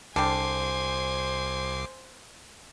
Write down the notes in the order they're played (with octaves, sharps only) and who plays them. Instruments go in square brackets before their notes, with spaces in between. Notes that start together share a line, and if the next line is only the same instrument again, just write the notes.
[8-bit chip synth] C2 D6 C7 [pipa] D3 G3 [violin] C5 G#5